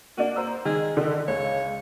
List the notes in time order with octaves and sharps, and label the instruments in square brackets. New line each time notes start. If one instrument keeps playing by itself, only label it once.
[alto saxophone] A#3 [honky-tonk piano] D4 F#4
[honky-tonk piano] C5 A#5 E6
[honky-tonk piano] D#3 [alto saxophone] G#4
[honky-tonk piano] D3 [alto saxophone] D#3
[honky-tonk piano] C#2 F5 [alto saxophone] C#5